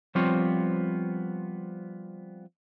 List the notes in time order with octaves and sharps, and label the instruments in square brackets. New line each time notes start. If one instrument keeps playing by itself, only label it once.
[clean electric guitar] F3 G3 B3 C4 F4 C#5